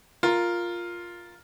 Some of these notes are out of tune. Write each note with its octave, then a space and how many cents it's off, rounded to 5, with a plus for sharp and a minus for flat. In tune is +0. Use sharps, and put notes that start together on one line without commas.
F4 +0 A#4 +0